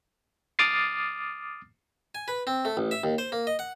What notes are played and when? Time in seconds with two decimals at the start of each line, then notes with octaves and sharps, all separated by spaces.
0.59 D6 D#6 F6 A6 C7
2.15 G#5
2.28 B4
2.47 C4
2.65 A3
2.77 A1
2.91 E5
3.04 D#2
3.18 C5
3.32 A#3
3.47 D#5
3.59 F#5